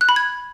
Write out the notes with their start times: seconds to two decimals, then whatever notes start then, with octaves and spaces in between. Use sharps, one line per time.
0.01 F#6
0.09 B5
0.16 G#6